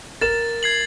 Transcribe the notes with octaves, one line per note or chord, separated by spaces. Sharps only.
A#4 A6 E7
G#6 C7 F#7